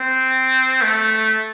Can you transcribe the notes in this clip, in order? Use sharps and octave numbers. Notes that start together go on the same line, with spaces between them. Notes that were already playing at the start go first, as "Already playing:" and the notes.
Already playing: C4
A3